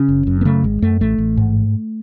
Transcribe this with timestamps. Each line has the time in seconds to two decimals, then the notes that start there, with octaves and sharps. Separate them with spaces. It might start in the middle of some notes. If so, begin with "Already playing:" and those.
Already playing: C#3 C#4
0.09 F#1
0.27 F#2
0.41 B3
0.45 C#3 A3
0.64 G#1 G#3
0.82 F#2 A3
1.01 A1 A3
1.18 A1
1.37 G#2